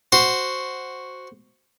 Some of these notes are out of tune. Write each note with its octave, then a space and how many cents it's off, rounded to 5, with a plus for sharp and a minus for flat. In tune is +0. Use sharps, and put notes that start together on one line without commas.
F#4 +0 C5 +0